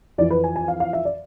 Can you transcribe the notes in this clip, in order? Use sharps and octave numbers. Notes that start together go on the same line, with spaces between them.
F2 E3 D5
B4
G#5
G#5
F5
F5
E5
D5